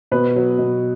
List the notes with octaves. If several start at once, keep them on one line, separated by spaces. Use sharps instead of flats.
B2 B4
F#3
B2